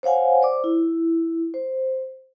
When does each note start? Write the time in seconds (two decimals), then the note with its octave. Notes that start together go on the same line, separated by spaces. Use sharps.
0.03 C5 C#5 F5 F#5 G#5
0.41 C5 D5 D6
0.64 E4
1.54 C5